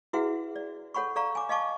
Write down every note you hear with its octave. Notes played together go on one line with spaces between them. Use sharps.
E4 F#4 G#4 B4 E5 F#5
D5
A4 C#5 F#5 B5 C#6
A4 D5 F5 A#5 C#6
G#5 D6
D#5 F5 A5 C#6 D6